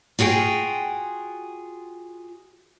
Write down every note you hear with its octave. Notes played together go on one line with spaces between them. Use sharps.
F4 F#4 G#4 G5